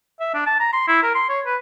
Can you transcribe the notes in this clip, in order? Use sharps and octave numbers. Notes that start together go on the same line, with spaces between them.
E5
D4
A5
A#5
C6
E4
A#4
C6
C#5
B4